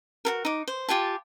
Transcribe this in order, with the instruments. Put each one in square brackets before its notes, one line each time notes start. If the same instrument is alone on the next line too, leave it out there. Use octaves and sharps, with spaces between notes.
[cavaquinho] F#4 A4 A#4
D#4 D6
C5
F4 G4 G#5 A5